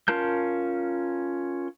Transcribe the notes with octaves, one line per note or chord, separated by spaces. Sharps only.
C#4 F4 A#4 A5 G6